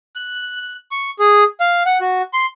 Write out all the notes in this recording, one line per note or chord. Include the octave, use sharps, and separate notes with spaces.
F#6
C#6
G#4
F5
F#5
F#4
C6